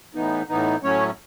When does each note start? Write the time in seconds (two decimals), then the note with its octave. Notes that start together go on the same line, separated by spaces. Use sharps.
0.15 A2 E3 B3 D#4
0.49 A2 E3 B3 D#4
0.83 A2 F#3 A3 C#4 C#5